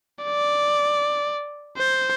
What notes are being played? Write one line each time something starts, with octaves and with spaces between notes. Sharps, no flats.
D5
C5